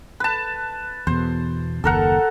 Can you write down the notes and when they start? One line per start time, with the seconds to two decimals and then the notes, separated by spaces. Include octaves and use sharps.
0.20 B4 A5
1.07 E2 B2 C5
1.84 F#1 D#2 A4 A#4 F#5